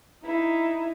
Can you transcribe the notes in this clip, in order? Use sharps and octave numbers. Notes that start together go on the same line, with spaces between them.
D#4 E4